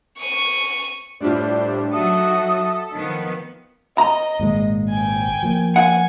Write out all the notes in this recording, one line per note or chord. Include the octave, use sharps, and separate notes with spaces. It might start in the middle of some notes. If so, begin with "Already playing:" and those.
C#6 D#7
A2 G3 D4 F4 A4 C5 D5
F#3 D#4 F#4 A4 E5 D#6
D#3 F3 B3
D#5 A#5
G#1 A#2 G#3
G5 G#5
F3 A#3
F#5 G#5